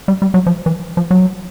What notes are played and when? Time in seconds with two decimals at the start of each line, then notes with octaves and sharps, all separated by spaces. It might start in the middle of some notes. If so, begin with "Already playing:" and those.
0.08 G3
0.22 G3
0.34 F#3
0.46 F3
0.66 E3
0.97 F3
1.11 F#3